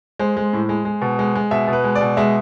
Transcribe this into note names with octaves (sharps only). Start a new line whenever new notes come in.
G#3 C5
G#3
A2
G#3
G#3
B2
G#3
G#3
B2 E5
B2
B4
G#3
D5
B2
G#3 E5